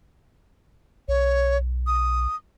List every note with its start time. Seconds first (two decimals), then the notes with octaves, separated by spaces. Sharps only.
1.08 B1 C#5
1.87 D#6